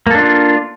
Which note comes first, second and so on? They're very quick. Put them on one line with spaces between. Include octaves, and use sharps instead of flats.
A#3 A4 D4 F4